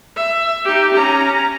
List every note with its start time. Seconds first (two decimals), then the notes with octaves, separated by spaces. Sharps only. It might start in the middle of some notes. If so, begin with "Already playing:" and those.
0.16 E5
0.65 D#4 G4
0.94 C#4 A#5